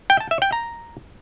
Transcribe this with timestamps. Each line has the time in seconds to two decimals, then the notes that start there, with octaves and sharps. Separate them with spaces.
0.10 G5
0.20 A5
0.31 E5
0.42 G5
0.52 A#5